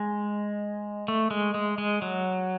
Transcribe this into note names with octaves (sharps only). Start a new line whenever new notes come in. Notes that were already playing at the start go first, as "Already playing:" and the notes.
Already playing: G#3
A3
G#3
G#3
G#3
F#3